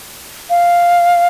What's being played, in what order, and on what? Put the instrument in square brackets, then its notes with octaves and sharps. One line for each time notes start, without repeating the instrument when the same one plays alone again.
[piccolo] F5